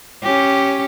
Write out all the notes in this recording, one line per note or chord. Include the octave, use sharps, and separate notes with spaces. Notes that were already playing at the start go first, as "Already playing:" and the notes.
C#4 G4